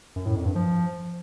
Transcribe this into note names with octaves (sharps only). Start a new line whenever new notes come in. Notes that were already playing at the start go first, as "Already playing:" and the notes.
F#2
A2
F2
G2
F3